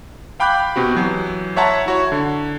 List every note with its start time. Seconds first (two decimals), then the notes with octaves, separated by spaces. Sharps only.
0.40 F5 G5 B5 D6 F#6 G6
0.76 B2 C4 F#4 G4
0.95 E3 F#3
1.56 C#5 E5 F#5 A5 A#5 C6
1.86 E4 F#4 C#5
2.12 D3